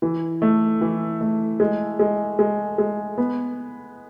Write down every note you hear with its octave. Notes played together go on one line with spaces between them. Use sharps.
E3
A3
E3
A3
G#3
G#3
G#3
G#3
B3